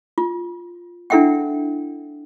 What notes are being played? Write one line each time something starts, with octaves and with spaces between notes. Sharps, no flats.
F4
D4 E4 A4 E5 F#5 G5